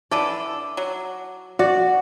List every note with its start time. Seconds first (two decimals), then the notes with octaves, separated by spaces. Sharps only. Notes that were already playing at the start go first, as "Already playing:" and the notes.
0.11 D3 E3 A4 D5
0.77 F#3
1.59 F#4 D5